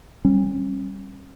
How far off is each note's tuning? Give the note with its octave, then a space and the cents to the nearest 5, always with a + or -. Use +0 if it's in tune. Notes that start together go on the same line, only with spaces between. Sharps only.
G3 +0 C#4 -35